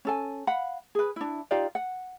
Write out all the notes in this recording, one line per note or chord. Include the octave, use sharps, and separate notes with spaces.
C#4 A4 G#5
F5 F#5 B5
G#4 B4
D4 E4
D#4 F4 G4 D5
F#5